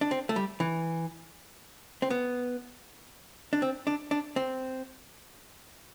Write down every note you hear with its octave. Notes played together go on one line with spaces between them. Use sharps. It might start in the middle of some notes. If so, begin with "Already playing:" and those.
D4
C4
A3
G3
E3
C4
B3
D4
C4
D4
D4
C4